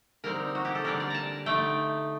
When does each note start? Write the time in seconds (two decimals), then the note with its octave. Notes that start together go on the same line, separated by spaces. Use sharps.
0.24 D3 G3 C4 D#4 A#4
0.55 F#4
0.65 G4
0.75 A4
0.85 D3 G3 D4 A#4
1.00 D5
1.10 A5 A#5
1.46 D3 A3 D#4 G5